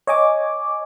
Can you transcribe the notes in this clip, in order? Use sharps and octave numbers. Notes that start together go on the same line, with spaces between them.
C#5 D#5 G#5 D6